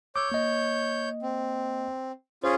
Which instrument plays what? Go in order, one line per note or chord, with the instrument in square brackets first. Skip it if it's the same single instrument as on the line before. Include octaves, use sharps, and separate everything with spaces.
[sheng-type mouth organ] C#5 G6 [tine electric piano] D6 E6
[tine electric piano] A#3 D#5
[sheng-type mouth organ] C4
[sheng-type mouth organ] C#4 F4 G#4 [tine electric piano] C5